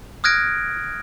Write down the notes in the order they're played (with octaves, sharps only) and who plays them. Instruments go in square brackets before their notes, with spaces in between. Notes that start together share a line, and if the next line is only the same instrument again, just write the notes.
[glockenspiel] D#6 F6 F#6 G#6 A#6 D7